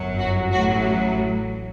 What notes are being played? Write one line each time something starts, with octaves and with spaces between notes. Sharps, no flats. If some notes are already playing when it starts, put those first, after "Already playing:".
Already playing: G1 F#2 F#3
F#4
A1 A2 F#3 F#4